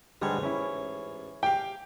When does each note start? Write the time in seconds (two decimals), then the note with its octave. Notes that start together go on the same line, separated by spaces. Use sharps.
0.22 A1 G#2 D3 G3 G#3 C#5
0.43 C#4 E4
1.43 G4 F5 G5